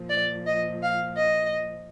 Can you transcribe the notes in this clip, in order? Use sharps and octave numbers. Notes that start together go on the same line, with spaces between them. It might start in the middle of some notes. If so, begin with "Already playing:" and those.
Already playing: A#2 F3
D5
D#5
F5
D#5